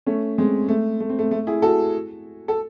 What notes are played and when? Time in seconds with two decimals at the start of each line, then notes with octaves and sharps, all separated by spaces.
0.06 A3 C#4
0.38 G#3 C4
0.68 A3
1.00 A3
1.10 C4
1.19 A3
1.31 A3
1.47 E4 G#4
1.62 F#4 A4
2.48 A4